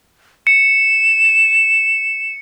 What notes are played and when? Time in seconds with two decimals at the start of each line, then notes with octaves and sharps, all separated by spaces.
0.47 C#7 E7